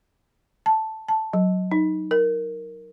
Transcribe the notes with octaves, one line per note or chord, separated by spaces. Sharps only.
A5
A5
F#3
D#4
A#4